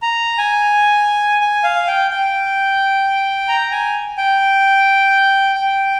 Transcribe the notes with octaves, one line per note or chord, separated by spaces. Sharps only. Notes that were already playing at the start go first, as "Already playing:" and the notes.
A#5
G#5
G#5
F5
G5
G5
A#5
G#5
G5
G5